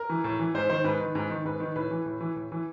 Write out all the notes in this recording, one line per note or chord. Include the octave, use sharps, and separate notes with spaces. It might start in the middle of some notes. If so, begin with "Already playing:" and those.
Already playing: A#4
E3
A2
E3
G#2 C5
D#3 C5
G#2 B4
D#3
G#2
D#3
G#2 B4
D#3
A2 B4
E3
A2
E3
A2
E3